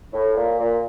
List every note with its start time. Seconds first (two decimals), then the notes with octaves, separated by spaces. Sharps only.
0.13 A2
0.36 A#2
0.59 A#2